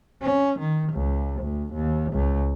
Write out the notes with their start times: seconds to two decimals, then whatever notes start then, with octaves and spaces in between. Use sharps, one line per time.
0.22 C#4
0.59 D#3
0.93 C#2
1.41 D2
1.74 D#2
2.12 C#2